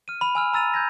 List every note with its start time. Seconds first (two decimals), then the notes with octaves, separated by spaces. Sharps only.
0.08 F6 D#7
0.21 B5 F7
0.35 G#5 E6 F6 F7
0.53 A#5 E6 A6 D#7 F7
0.74 G6 G#6 A#6